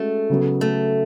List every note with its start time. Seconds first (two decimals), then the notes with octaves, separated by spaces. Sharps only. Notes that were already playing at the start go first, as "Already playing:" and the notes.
Already playing: G#3 A3 C#4 F#4
0.30 C#3 F#3 B3
0.61 A3